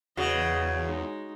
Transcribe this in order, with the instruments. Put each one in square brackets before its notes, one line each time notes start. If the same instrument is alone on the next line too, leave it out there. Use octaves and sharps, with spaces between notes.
[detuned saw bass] E2 [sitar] C#3 [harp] F#4 F#5 [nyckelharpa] B4 D#5
[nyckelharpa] G#3 D#4